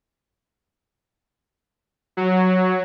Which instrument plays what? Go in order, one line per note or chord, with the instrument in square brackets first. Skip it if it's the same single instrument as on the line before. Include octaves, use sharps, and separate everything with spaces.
[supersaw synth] F#3